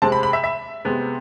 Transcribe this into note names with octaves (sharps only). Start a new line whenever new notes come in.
C3 G#3 C4 A5
B5
B5
E5
E5
C3 G#3 B3